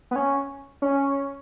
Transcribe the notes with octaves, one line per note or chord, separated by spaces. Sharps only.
B3
C#4
C#4